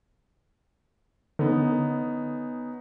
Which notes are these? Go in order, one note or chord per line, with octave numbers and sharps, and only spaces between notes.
D3 B3 C#4 D#4